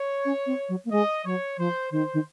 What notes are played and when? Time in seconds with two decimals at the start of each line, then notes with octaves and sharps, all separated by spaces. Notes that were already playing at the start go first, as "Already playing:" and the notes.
Already playing: C#5
0.25 C#4
0.46 C4
0.69 F#3
0.85 A#3
0.91 G#3 D#5
1.25 F#3 C#5
1.58 F3 C5
1.91 D#3 C5
2.13 D#3